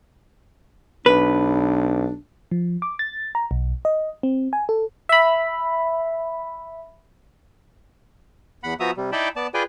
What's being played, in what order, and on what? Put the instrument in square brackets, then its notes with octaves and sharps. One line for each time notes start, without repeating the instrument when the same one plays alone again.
[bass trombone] B1 [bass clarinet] D4 [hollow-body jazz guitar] B4
[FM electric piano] F3
D6
A6
A#5
B1
D#5
C4
G#5
A4
E5 B5
[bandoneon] E2 F#5 B5
F3 B3 F#4 E5 A#5 D#6
C3 G3
D#4 E4 D5 G5 A5 B5
B3 D5 A5
F4 G#4 B4 D5 G5 G#5